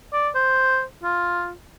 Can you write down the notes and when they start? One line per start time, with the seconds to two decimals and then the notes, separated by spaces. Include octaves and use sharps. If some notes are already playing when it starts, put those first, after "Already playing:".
0.13 D5
0.35 C5
1.03 F4